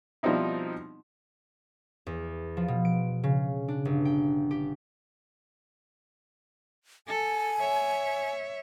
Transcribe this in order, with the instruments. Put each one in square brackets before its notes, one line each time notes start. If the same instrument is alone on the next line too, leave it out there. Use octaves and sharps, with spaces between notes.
[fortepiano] B2 F3 G3 C4 D#4 E4
[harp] E2
F3
B2
D7
C#3
D4
G1
G5
G4
[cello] A4 [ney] G#5
[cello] C#5 E5